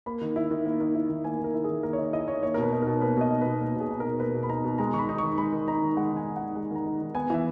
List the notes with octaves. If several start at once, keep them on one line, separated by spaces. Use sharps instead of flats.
A#3 B5
D#3
E4
D#3
A#3
D#3
E4
D#3
A#3 G#5
D#3 A#4
E4
D#3 G#4
A#3 A#4
C#5
D#3 D#5
E4 D#5
D#3 C#5
A#3 C#5
A#4
B2
B4
D#4
B2 A#4
A#3 B4
B2 D#5
D#4
B2 B4
A#3 A#4
B2 G#4
D#4
B2 A#4
A#3 B4
B2
B5
D#4 A#5
B2
G#3 A#5
D#3 C#6
B5
D#4
D#3 C#6
G#3 B5
D#3
D#4 A#5
D#3
G#3 F#5
D#3 G#5
D#4
F#5
D#3
G#3
D#3 A#5
D#4
D#3
B3 G#5
E3 E5